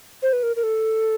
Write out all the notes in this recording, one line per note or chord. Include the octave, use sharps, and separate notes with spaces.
C5
B4
A#4
A#4
A4